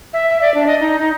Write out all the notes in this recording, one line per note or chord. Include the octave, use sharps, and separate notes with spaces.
E5
E5
D5
D4
D#5
D#4
D#4